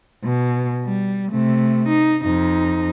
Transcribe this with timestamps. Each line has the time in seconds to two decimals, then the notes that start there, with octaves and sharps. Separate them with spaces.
0.24 B2
0.85 G3
1.32 C3 A3
1.88 D#4
2.24 F2 D#4